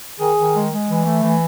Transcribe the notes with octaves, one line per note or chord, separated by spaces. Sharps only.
D#3 G#4
D#3
G#3
G#3
E3
A3
E3